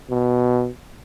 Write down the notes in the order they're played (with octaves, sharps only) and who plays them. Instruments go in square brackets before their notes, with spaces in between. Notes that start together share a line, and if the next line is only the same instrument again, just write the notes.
[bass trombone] B2